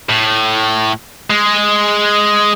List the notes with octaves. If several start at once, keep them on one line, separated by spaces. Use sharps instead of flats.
A2
G#3